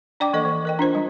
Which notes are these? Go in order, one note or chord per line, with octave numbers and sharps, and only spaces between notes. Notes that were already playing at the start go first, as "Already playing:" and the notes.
D4 D5 G5 D6
E3 A#3 A4 D#5
E3
A#4 D#5 G5
D4 F4 C5
G3 D4